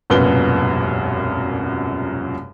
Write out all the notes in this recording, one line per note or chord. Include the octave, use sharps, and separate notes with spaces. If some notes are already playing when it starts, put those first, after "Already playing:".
E1 C2 F#2 A#2 B3 G7